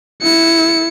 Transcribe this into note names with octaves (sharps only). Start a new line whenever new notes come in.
E4 C#7